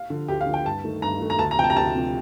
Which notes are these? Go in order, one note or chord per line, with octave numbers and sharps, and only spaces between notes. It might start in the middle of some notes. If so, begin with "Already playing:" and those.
Already playing: F5
D3 F3
D2 G4
F5
D3 F3
G5
G2 A5
D#3 A3
G2 A#5
D#3 A3
A#5
D2 A5
A#5
C3 F3 G5
A5
A#5
D2 A5
C3 F3